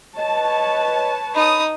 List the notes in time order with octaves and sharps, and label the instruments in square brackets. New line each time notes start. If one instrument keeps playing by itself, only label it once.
[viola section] B4 C#5 A5 [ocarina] D#5
[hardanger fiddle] D#4 D#6 [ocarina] B5